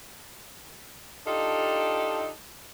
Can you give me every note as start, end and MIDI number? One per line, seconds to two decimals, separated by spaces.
1.26 2.28 62
1.26 2.28 63
1.26 2.28 65
1.26 2.28 67
1.26 2.28 69